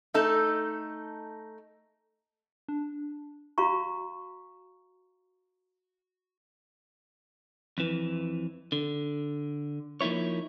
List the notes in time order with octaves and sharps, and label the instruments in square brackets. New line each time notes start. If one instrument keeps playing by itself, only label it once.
[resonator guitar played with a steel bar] A3 D#4 A4
[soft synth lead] D4
[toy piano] F#4 F5 A#5 C#6
[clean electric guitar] F2 E3
D3
F3 A#3 D#4 E4 C#5